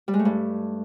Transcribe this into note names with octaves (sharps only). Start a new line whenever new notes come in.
G3
G#3
A3
G2